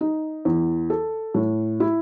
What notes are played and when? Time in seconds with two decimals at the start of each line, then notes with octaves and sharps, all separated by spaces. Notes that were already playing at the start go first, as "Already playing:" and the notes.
0.01 D#4
0.45 E2
0.90 A4
1.34 A2
1.80 E4